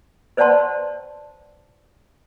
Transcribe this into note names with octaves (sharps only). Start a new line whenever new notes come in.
B4 C5 D5 F#5 A5 C6